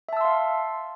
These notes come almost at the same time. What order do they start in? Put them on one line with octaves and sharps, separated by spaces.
E5 A5 E6 C6 F5